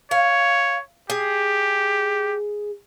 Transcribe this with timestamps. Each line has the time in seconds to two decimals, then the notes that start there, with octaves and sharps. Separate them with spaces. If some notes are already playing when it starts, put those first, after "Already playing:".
0.11 C#5 F5
1.10 G4 G#4